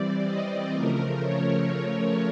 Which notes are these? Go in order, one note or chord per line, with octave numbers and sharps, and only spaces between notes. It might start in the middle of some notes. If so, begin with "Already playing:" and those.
Already playing: E3 G3 C4 D5
D#5
C#3 F3 A3 A#4
C#5